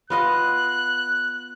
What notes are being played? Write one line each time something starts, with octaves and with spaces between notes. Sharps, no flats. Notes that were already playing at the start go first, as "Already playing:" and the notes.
B3 F4 D#5 F#6